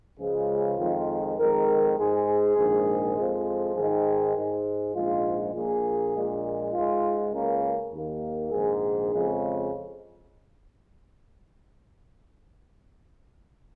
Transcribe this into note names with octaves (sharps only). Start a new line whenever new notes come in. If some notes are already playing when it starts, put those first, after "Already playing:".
C#2 C#3 F3 G#3 G#4
F2 D#3 G#3 F4
F2 D#3 G#3 A#4
G#2 G#3 G#4
G#4
A#1 G#2 D#3 G#3
F2 F3 G#3
G#2 D#3 G#3 G#4
G#2 G#3
A#1 G#2 G#3 F4
A#1 A#2 A#3 G#4
A#1 A#2 G#3
G#2 G#3 F4
C#2 C#3 A#3 A#4
D#2 D#3 A#3
A#1 G#2 D#3 G#4
F2 C#3 G#3